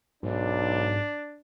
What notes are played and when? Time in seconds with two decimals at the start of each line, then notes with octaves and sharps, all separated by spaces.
0.23 B1 G#2 D4